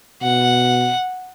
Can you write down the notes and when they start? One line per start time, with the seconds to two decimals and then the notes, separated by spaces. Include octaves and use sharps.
0.22 B2 F#5